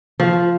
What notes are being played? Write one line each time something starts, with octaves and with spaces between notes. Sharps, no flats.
F3